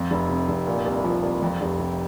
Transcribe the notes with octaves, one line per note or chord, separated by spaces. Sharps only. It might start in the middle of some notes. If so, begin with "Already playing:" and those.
Already playing: F2
F1
C3
F1
A#2
C2
F3
C2
F2
F1
C3